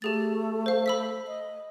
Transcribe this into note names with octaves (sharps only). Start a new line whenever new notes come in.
A3 G4 G#4 A6
C5 F5
B5 E6 B6
D#5